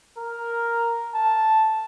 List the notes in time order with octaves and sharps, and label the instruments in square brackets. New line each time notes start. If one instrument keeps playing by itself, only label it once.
[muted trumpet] A#4
A5